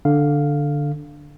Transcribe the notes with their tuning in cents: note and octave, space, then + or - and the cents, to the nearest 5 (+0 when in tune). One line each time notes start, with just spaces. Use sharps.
D3 +0 F5 +0